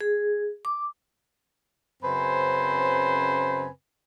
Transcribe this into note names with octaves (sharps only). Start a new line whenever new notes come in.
G#4
D6
F#2 C#3 C4 B4 C5 G#5